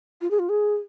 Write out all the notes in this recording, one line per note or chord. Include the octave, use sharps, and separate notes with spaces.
F4
G#4
F4
G#4